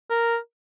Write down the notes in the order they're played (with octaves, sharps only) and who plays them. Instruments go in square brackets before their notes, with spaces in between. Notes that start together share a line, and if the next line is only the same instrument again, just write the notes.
[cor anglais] A#4